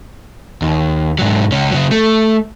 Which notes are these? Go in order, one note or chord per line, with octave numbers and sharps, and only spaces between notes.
D#2
G#2 F#3
C#2 C#4
C#3 F#3
A3